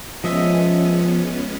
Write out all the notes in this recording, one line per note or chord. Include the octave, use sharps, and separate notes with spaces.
F3 G#3 B3 C#4 D#5 E5